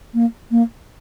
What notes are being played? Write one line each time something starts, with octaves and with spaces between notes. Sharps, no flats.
A#3
A#3